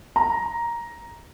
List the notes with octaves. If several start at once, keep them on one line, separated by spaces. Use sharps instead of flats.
A#5